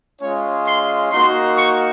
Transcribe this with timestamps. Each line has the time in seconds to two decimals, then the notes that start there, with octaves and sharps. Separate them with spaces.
0.21 G#3 C#4 F4 C#5
0.66 C6
1.11 A#3 D#4 F#4 C6
1.57 C#6